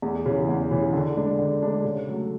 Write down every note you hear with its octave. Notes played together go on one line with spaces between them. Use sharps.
E2
C#3 E3
E2
C#3 E3
D3
G#3 D4
D3
G#3 D4
C#3
F#3 A3